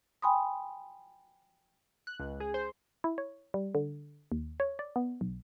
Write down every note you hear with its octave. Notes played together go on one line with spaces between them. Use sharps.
G5 G#5 B5 C6 D#6
F#6
C#2
G#4
C5
E4
C#5
G3
D3
D#2
C#5
D5
B3
B1